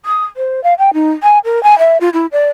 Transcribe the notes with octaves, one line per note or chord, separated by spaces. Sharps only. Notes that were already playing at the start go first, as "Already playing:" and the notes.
D#6
C5
F5
G5
D#4
G#5
A#4
G#5
E5
F4
E4
D5